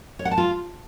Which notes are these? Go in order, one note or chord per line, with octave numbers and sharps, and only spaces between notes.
C#5
F#5
A5
F4